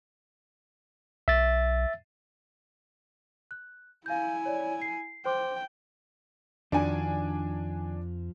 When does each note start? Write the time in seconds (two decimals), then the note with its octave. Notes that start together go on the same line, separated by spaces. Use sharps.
1.28 B1 E5 A6
3.51 F#6
4.06 E4 F5 G#5 G6
4.46 C#5 D5
4.82 C7
5.25 C5 G5 C6 D6
6.72 F2 D#3 F3 D4 F#4 D5 G#5